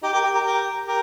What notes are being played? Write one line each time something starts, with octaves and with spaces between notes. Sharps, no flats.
D#4 G4
G4 A#4
G4 A#4
G4 A#4
G4 A#4
G4 A#4